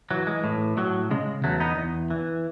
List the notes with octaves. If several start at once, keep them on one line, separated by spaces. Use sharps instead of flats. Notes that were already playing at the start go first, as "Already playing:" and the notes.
E3 F#3
G#3
A2
A2 F#3
C#3 G#3
E2 F#3 A3
B3 D#4
E2
E3